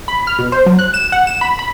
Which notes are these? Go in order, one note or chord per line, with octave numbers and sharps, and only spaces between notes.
B5
F6
B2
C5
F#3
F#6
E7
F#5
E7
B5
B5